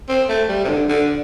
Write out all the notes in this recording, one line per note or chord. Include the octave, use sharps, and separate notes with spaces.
C4
A3
G3
C3
D3
D3